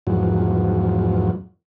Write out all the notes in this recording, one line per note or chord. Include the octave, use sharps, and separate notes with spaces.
E2 G#2 F3 F#3